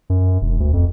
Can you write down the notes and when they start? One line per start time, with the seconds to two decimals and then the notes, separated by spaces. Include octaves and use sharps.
0.10 F#2
0.41 E1
0.60 D2
0.73 F2